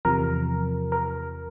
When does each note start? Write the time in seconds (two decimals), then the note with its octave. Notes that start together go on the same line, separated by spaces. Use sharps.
0.05 E2 C3 F3 A#4
0.92 A#4